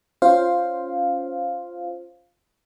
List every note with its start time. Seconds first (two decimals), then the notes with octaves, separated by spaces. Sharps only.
0.22 C#4 F4 C5 F5